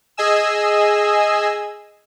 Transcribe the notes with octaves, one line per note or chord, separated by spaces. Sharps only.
G#4 D#5 G#5 E6